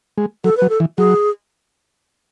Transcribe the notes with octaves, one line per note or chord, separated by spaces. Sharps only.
G#3
F#3 A4
F#3 B4
A4
E3
F#3 G#4